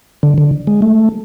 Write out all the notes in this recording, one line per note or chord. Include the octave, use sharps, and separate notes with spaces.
D3
D3
G#3
A3